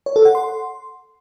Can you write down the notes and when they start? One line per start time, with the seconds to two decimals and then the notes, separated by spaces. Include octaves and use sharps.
0.06 C#5
0.16 A4
0.25 F#5
0.35 C6